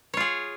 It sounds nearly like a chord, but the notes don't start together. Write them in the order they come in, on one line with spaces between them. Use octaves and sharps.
C#5 F4 G#4